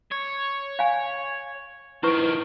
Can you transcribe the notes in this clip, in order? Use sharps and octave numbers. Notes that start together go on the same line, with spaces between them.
C#5
F5 G#5
D#3 F3 E4 B4 C#6